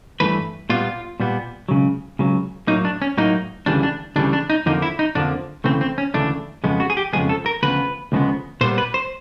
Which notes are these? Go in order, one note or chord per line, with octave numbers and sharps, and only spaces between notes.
G2 E3 A3 B4
A#2 G3 B3 F4
A#2 G3 B3
C#2 C#3 F#3
C#2 C#3 F#3
A2 F#3 A#3 D#4
D4
C#4
A2 F#3 A#3 D#4
D2 C#3 E3 G3 D4
D4
D2 C#3 E3 G3 D4
D4
D#4
F2 D3 F3 A#3 D#4
E4
D#4
F2 D3 F3 A#3 D4
D2 C#3 E3 A3 C4
C4
C#4
D2 C#3 E3 A3 D4
F2 C#3 F3 G#3 B3
F#4
G#4
G4
F2 C#3 F3 G#3 B3 G#4
A4
A#4
D2 C#3 F3 B3 B4
D2 C#3 F3 G#3 B3
A#2 G3 B3 C5
B4
C5